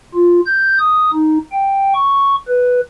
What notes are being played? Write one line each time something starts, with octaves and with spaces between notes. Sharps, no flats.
F4
G6
D#6
D#4
G5
C#6
B4